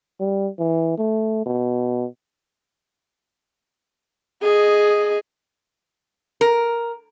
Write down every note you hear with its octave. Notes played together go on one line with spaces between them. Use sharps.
G3
E3
A3
B2
G#4 D#5
A#4